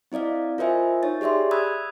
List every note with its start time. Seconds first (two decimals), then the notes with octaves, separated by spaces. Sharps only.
0.12 C4 E4 D5 D#5 F5
0.58 F4 A#4 C5 D#5 E5 G#5
1.03 D#4 C#5 A6
1.21 G4 G#4 D5 E5 C6
1.51 B5 D#6 E6 F#6 G#6